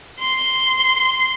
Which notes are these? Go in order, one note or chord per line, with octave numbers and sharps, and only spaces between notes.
C6